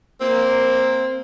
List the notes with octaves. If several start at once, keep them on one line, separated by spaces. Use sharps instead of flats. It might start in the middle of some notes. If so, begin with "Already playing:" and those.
A#3 C4